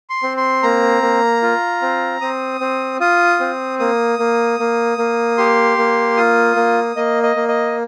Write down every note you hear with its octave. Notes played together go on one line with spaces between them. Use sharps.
C6
C4
C6
A#3 A#5
A#3
F4
C4
C4 D#6
C4
F4 D#6
C4
A#3 D#6
A#3
A#3
A#3
G4 C6
A#3
F4 D#6
A#3
A#3 D#5
D#5
A#3
D#5